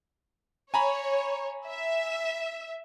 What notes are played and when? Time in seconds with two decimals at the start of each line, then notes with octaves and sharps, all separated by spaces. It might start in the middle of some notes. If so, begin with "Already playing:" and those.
0.74 C#5 G#5 A#5 B5
1.66 E5